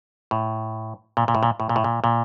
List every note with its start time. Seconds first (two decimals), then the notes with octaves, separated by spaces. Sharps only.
0.31 A2
1.17 A#2
1.28 A#2
1.35 A2
1.43 A#2
1.60 A2
1.69 A#2
1.76 A2
1.84 A#2
2.04 A#2